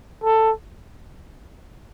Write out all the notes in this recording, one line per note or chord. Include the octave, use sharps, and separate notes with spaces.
A4